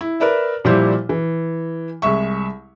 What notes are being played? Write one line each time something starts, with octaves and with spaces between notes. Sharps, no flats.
E4
A#4 B4 D5 E5
A#2 F3 G3 E4 G4 C5
E3
C2 G#3 E5 C#6